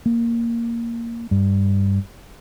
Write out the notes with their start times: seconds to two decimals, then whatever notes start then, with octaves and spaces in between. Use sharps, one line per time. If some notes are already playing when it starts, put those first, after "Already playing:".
0.06 A#3
1.31 G2